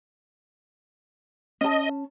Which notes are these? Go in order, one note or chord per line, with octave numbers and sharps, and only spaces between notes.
C#4 D#5 A5